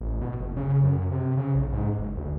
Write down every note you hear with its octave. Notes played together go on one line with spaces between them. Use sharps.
A1
B2
F#1
C#3
F#2
C3
C#3
B1
G#2
F#1
D2